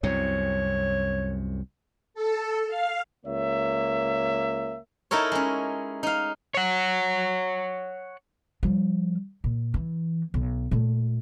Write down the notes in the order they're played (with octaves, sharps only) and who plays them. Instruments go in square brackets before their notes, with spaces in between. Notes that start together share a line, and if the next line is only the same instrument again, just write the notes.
[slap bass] C2 F#2 C3 [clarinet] C#5
[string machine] A4
F5
[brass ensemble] C#2 A#3 C#5 E5
[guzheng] D#4 E4 A4 A#4 C#5
G#3 C#4
D#4 F5
[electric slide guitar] C#5 F#5
[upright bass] F3 G3
A#2
E3
B1
A#2 A3